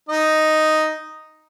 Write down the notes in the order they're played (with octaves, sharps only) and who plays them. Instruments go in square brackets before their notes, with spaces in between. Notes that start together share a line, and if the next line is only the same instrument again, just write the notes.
[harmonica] D#4 D#5